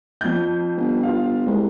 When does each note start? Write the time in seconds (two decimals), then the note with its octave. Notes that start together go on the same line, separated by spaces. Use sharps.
0.21 F2 G6
0.77 G1
1.03 F4 F5
1.46 C2 G#3